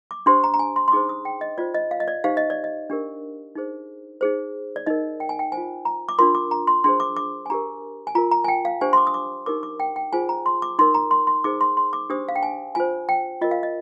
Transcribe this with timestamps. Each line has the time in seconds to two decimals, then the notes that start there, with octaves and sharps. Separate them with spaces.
0.11 D6
0.26 D4 G4 C5 C6
0.44 A#5
0.54 A#5
0.59 G#5
0.76 C6
0.88 C6
0.92 D#4 G#4 C5 D6
1.09 D#6
1.25 G5
1.41 D#5
1.58 F4 C5 D5
1.75 D#5
1.91 F5
2.00 D#5
2.08 D5
2.24 D#4 G4 C5 F5
2.37 D#5
2.50 D5
2.64 D#5
2.90 D4 G4 A#4
3.55 D#4 G#4 C5
4.21 D#4 G#4 C5
4.76 D5
4.86 D#4 A#4 D#5
5.20 G5
5.29 G#5
5.39 G5
5.52 C5 G#5
5.57 F4
5.85 A#5
6.09 D6
6.19 D4 F4 A#4 C6
6.35 D6
6.51 A#5
6.67 C6
6.84 D4 G#4 C5 C6
7.00 D6
7.16 D6
7.46 G#5
7.50 D4 G4 A#4 A#5
8.07 G#5
8.15 F4 A#4 A#5
8.31 A#5
8.44 G#5
8.48 G5
8.65 F5
8.81 D4 G4 C5 G#5
8.93 C6
8.97 D6
9.07 D#6
9.14 D6
9.46 D#4 G4 A#4 D6
9.63 D6
9.80 G5
9.96 G5
10.13 F4 G#4 C5 G#5
10.29 A#5
10.46 C6
10.62 D6
10.79 D#4 A#4 C6
10.94 A#5
11.11 C6
11.27 C6
11.44 D#4 G#4 C5 D6
11.61 C6
11.77 C6
11.93 D6
12.10 D4 G4 C5 D#6
12.29 F5
12.35 G5
12.43 G#5
12.75 F4 C5 G#5
13.09 G5
13.41 F4 A#4 D#5
13.51 F5
13.63 D#5